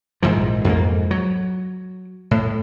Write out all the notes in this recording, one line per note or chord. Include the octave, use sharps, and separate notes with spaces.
A#1 G#2 E3 F3
F2 G#2 A3 A#3
F#3
A2